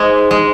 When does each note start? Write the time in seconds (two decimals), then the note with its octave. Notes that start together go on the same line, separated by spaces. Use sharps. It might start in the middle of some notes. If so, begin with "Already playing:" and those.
Already playing: G#2 G#3
0.31 G#3